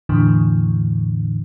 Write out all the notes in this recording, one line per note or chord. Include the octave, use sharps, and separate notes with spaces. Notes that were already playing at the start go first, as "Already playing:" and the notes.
E2 A2 D3 E3